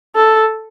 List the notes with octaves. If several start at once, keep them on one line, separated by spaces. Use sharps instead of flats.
A4